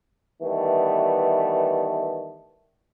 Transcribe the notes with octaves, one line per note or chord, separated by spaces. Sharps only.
D#3 E3 G3 A3 B3